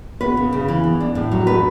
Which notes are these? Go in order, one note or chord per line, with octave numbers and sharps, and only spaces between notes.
B3 B4
C#3
C#3
E3
B3
D4
A2
F#3
D4 B4